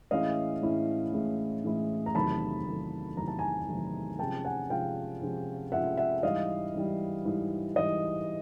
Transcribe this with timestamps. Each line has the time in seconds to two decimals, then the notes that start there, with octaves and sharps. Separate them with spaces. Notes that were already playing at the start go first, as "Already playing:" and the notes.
0.11 A2 E3 G#3 C#4 E4 D#5 F5
0.62 A2 E3 G#3 C#4 E4
1.13 A2 E3 G#3 C#4 E4
1.64 A2 E3 G#3 C#4 E4
2.06 A#5
2.15 E2 C3 D#3 F#3 A3 A5 B5
2.66 E2 C3 D#3 F#3 A3
3.17 E2 C3 D#3 F#3 A3 A#5
3.28 A5
3.39 G#5 A#5
3.68 E2 C3 D#3 F#3 A3
4.19 C3 F3 G#3 C#4 F4 G5 A5
4.45 F#5 G#5
4.70 C3 F3 G#3 C#4 F4 F5 G5
5.21 C3 F3 G#3 C#4 F4
5.72 C3 F3 G#3 C#4 F4 E5 F#5
5.97 E5 F#5
6.23 G#2 E3 G3 D#5 F5
6.74 G#2 E3 G3
7.25 G#2 E3 G3
7.76 G#2 E3 G3 D#5